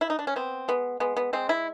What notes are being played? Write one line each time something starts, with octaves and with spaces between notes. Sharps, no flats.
E4
D#4
D4
C#4
B3 C4
G#3 B3
G#3 B3
B3
G#3 C4
E4